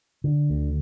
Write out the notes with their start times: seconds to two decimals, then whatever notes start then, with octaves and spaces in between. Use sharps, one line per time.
0.24 D3
0.50 D2